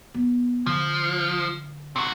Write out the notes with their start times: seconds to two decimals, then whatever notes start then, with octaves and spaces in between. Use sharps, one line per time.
0.14 B3
0.66 D3 F3
1.96 C3 F#4